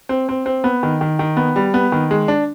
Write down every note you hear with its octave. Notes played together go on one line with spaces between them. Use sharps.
C4
C4
C4
B3
D#3
D#3
D#3
B3
G3
B3
D#3
G#3
D4